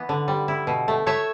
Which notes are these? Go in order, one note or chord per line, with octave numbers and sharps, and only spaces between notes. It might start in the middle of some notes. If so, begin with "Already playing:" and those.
Already playing: E3 B3 B4
D3
G3
E4
B2
A3
A3 C#5 E5